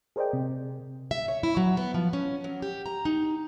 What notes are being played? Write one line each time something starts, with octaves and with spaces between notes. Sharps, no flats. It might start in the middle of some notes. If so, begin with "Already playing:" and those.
G#4 A#4 C5 D5 D#5 G5
C3
E5
C#5
E4
F#3
B3
F3
C#4
F#3
G4
A#5
D#4